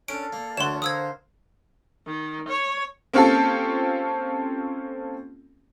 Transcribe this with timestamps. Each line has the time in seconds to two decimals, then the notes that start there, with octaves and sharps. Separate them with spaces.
0.08 C#4 D4 A4 A#4 D5 D7
0.33 A#3
0.57 D2 D3 C#5 F#5 C6 E7
0.82 D3 A#4 C5 F5 D#6 E6 G#6
2.06 D#3
2.49 C#5
3.13 A#3 C4 C#4 F4 G4 A4